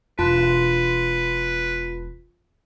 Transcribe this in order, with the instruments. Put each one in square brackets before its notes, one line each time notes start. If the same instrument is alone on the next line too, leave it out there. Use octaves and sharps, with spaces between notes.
[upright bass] E1 [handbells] F4 A5 [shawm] B4